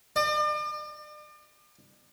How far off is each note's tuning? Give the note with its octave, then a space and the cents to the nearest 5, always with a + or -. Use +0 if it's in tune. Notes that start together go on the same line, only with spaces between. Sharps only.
D5 +40